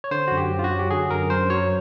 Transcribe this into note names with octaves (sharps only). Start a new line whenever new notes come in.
C#5
D3 C5
F#2 F#4
G4
F#2
F4
F#4
F#3
G4
D3 G#4
F#2 A#4
F#2 C5
F#3 C#5